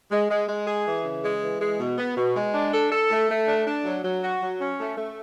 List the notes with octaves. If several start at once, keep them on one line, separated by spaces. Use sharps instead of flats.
G#3
G#3
G#3
G#4
E3
C#3
G#3
E3
G#3
B2
B3
B2
G#3
D4
A4
A4
A3
A3
D4
D4
F#3
F#3
F#4
F#3
C#4
A3
A3